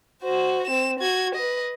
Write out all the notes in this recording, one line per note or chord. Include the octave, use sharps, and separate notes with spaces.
F#4 C5
C4 E7
F#4 G#6
B4 D#5